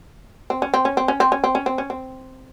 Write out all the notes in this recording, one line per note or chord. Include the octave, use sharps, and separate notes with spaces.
C4
C#4
C4
C#4
C4
C#4
C4
C#4
C4
C#4
C4
C#4
C4